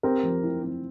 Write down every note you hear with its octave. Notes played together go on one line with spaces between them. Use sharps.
C4 G4 A#4
F3
E4
C4